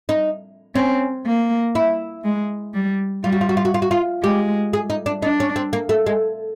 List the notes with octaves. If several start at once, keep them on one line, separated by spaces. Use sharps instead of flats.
D#4
C4 C#4
A#3
E4
G#3
G3
G3 F4
F#4
F4
F#4
F4
F#4
F4
F#4
F4
G#3 G4
G#4
D#4
D4
D4 D#4
C#4
C4
A#3
A3
G#3